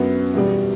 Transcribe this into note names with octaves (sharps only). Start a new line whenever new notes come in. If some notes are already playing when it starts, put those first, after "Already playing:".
Already playing: F#2 F#3 B3
E2 B2 G3